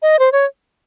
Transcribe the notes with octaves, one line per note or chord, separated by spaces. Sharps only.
D#5
C5
C#5